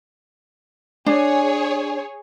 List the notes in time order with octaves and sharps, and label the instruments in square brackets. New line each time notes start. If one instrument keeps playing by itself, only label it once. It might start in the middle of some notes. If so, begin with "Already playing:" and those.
[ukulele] D4 [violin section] G#4 C#5